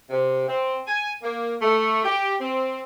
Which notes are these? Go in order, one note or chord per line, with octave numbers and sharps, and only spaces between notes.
C3
C4
G#5
A#3
A3
G4
C4